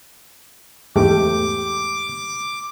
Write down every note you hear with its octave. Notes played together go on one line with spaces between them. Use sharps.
E2 G#2 A3 G4 D6